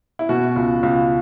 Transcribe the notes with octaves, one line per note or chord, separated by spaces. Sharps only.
E4
B2 F#4
C#2
C#2